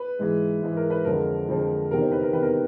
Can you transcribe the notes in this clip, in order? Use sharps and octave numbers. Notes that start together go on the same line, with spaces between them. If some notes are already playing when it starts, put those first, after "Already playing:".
Already playing: B4
G#2 E3 G#3
G#2 E3 G#3
A#4
B4
F2 D3 F3 G#3 A#4
F2 D3 F3 G#3
E2 C3 D#3 A#4
C5
B4
A#4
E2 C3 D#3 B4
A#4